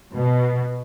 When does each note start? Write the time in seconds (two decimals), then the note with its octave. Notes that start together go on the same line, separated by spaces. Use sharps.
0.14 B2